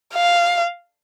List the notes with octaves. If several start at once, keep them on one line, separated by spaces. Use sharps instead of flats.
F5